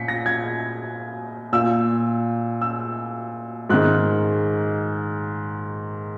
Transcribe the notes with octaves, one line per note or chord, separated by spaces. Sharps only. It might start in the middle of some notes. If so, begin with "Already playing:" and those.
Already playing: A#2 B6 C#7
A#6
G#6
A#2 E6
E6
G#2 D#3 F#6